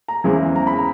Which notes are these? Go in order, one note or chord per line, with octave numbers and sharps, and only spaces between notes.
A#5
E2 C#3 E3 G#3 C4
A#5
B5
A#5